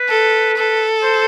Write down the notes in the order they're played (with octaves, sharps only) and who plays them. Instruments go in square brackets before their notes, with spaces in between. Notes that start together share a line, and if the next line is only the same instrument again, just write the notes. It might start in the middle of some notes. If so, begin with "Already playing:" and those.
Already playing: [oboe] B4
[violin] A4
A4
[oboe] C5